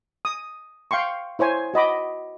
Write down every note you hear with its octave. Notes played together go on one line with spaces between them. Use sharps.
D#6
F5 G5 C6 C#6
E4 C5 C#5 G#5
F#4 D#5 B5 D6